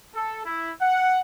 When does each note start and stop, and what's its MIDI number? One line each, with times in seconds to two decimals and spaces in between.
0.15 0.45 69
0.45 0.72 64
0.81 1.21 78